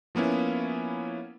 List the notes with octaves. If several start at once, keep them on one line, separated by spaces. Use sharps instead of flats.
F3 A#3 B3 C#4 E4